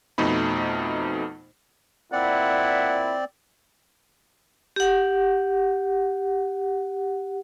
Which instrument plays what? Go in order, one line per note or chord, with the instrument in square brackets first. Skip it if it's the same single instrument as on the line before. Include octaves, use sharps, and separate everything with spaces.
[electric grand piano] F2 B2 A3 D#4 B5
[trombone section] A#2 E4 [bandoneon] C4 D5 [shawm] F#5
[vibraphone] G4 F#5